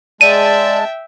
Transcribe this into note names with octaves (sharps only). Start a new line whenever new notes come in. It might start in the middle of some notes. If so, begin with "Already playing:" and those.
G#3 D5 E5 G5 A5 D#7